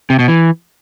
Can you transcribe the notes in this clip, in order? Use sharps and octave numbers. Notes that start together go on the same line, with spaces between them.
C3
B2
E3